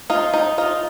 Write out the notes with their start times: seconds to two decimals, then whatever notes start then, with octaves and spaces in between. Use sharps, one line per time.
0.10 D#4 F4
0.34 D#4
0.58 D#4 F4